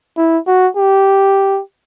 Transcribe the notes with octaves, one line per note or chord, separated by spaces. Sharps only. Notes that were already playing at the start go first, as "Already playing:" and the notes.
E4
F#4
G4